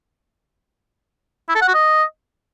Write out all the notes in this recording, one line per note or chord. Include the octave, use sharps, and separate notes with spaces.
E4
A4
F#5
F#4
D#5